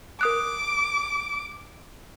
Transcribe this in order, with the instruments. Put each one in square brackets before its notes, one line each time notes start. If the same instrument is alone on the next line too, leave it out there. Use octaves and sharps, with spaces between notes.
[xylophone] A#4 D#6 F#6 [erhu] D6